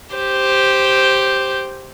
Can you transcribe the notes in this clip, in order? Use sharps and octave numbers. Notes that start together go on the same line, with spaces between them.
G4 C5